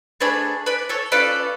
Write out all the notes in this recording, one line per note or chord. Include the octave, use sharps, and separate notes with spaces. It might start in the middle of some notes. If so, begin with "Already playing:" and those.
A3 D4 G#4 B4 D5
B4 D5
A4 C#5
C#4 F4 A4 B4 D5